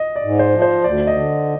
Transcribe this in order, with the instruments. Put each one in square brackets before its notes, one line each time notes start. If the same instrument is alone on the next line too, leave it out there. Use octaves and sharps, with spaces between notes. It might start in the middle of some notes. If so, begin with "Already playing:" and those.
Already playing: [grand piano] D#5
D5
[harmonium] G#2
[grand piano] C5
[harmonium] F3
[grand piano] C5
[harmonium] D2 [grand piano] D5
[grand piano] D#5
[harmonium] D3